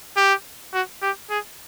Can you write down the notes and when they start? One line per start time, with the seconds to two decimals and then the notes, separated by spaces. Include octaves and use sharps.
0.17 G4
0.74 F#4
1.02 G4
1.30 G#4